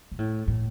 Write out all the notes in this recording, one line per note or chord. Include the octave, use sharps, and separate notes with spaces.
A#2
A2
A2